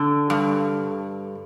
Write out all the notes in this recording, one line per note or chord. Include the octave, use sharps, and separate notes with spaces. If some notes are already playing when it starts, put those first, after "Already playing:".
Already playing: D3
G2